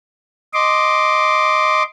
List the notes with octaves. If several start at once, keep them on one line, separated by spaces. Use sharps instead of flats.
D#5 C6 D6